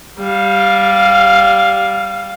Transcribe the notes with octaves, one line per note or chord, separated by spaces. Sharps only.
G3 F5